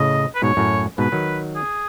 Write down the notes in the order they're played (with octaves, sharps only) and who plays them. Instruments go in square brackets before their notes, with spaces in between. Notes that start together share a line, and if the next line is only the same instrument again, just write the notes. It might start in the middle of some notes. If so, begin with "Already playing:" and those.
Already playing: [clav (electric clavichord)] A2 C#3 [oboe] D#5
[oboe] B4
[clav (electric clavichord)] G#2 B2 [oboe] C#5
[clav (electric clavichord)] F#2 A2
[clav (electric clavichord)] G#2 B2 [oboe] B4
[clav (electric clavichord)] D#3 F#3
[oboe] G#4